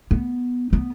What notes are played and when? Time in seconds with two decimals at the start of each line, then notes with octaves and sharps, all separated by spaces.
0.11 B3
0.73 B3